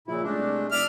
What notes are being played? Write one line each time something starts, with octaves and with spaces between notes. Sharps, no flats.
A#2 C#3 F3 E4
C#2 G#3 A3 D4
C2
F1 D4 E5 F6